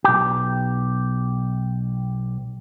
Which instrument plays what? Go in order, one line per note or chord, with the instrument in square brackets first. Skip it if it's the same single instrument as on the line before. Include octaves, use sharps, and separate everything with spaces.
[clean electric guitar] B1 G4